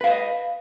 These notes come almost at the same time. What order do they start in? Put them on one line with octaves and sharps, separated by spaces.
B4 F5 C5 D#5